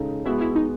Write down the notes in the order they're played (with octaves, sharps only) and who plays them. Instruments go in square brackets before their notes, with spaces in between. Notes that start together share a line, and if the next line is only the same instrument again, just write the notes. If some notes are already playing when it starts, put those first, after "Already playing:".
Already playing: [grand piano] C#3 G#3 D#4 A4
[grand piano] G#3 B3 F#4 [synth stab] E4
[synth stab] E4
D#4